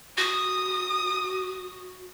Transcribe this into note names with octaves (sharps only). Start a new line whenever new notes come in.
F#4 D#6